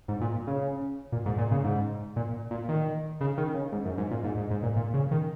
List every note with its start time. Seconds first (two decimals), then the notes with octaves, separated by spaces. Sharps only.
0.08 G#2
0.21 A#2
0.47 C#3
1.12 A#2
1.26 G#2
1.38 A#2
1.51 C#3
1.64 G#2
2.16 A#2
2.51 A#2
2.69 D#3
3.21 C#3
3.38 D#3
3.54 C#3
3.72 G#2
3.85 F#2
3.98 G#2
4.11 A#2
4.24 G#2
4.37 G#2
4.51 G#2
4.63 A#2
4.76 A#2
4.94 C#3
5.11 D#3